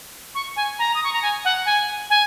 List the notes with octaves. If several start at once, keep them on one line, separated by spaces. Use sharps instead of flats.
C#6
G#5
A#5
D#6
C#6
A#5
G#5
F#5
G#5
G#5